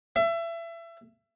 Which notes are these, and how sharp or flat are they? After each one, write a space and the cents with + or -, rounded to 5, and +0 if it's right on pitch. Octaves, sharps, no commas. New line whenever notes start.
E5 +30